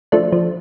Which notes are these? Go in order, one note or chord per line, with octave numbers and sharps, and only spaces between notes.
F3 A3 D4
F3